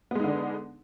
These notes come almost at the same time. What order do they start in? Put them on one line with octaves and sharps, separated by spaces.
B3 G#3 D#4 D3 D4